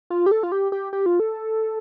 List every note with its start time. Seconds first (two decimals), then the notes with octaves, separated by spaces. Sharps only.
0.10 F4
0.26 G4
0.31 A4
0.43 F4
0.52 G4
0.72 G4
0.93 G4
1.06 F4
1.20 A4